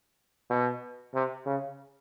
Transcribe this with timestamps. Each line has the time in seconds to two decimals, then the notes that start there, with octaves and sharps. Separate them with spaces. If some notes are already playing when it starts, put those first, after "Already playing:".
0.50 B2
1.14 C3
1.46 C#3